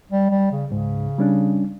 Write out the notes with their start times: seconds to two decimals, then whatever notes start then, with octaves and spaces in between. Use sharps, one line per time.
0.11 G3
0.30 G3
0.52 C#3
0.71 C#2 G#2 C#3
1.18 G3 C#4 D4